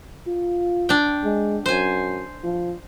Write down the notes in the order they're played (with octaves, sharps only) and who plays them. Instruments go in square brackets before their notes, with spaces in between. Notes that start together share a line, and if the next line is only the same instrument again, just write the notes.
[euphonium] F4
[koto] D4 G5
[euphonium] G#3
[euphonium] F#2 [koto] C5 G#5
[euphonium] F3